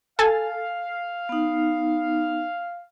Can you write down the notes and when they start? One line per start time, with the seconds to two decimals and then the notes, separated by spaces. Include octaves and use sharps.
0.19 A4 F5 G#5 A6
1.29 B3 D#4